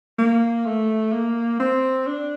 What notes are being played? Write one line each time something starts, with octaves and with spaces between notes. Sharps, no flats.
A#3
A3
A#3
C4
D4